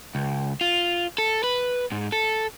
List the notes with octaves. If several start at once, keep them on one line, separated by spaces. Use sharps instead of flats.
C#2
F4
A4
B4
G#2
A4